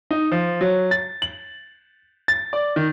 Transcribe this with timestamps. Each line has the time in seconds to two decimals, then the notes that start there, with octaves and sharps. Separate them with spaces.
0.11 D#4
0.32 F3
0.61 F#3
0.91 A6
1.22 F#7
2.28 A6
2.53 D5
2.76 D#3